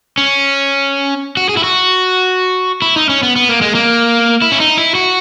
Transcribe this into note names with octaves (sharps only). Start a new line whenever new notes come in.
C#4
F#4
G#4
E4
F#4
E4
D#4
C#4
B3
B3
A#3
G#3
A#3
E4
C#4
D#4
E4
F#4